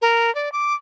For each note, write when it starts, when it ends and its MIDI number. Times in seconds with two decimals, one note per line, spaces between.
0.02 0.33 70
0.35 0.52 74
0.52 0.74 86